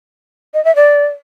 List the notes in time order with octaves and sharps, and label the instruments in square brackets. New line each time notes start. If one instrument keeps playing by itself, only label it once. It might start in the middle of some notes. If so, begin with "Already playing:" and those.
[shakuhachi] D#5
E5
D5